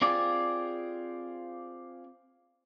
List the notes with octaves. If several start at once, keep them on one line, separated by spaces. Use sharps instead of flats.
C4 F4 G4 G#4 D5